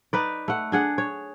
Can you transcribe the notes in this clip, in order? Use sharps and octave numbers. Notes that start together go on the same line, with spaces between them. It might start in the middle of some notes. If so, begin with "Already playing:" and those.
D#4 B4 D5
A3 F#5
D4 G#4 F#5
C#5